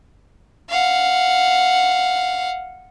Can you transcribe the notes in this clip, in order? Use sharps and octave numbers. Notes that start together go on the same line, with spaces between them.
F5 F#5